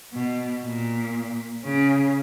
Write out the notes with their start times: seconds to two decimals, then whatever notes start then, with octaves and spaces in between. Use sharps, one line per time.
0.13 B2
0.64 A#2
1.64 C#3